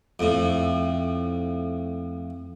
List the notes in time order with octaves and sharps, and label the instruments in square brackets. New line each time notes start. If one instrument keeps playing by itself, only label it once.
[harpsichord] F2 A2